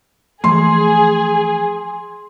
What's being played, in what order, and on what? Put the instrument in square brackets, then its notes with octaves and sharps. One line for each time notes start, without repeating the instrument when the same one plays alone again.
[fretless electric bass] E3 F3 A3 [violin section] G#4 [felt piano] C6